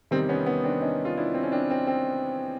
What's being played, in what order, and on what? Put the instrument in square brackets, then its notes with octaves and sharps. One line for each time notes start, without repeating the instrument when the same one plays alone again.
[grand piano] E2 C3 D#3 G3 C4
B3 C#4
B3 C#4
C4 D4
C#4 D#4
F4
D4 E4
C4
C#4
C4 D4
C4
C4